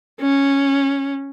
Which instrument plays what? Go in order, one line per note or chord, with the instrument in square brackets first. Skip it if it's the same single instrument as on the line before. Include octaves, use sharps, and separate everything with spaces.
[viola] C#4